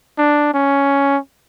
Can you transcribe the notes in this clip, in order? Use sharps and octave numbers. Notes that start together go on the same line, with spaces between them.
D4
C#4